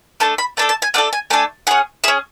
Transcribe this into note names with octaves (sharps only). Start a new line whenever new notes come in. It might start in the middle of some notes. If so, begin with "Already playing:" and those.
A3 D4 A4 A5
B5
A3 D4 A4 A5
A5
G#5
A3 D4 A4 F#5
G#5
A3 D4 A4 G#5
C#4 G#4 F#5
C#4 G#4 E5